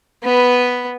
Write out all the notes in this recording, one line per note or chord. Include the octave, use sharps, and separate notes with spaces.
B3 B4